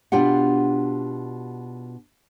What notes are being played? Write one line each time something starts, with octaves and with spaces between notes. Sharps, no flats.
B2 D4 F4 G4 F#5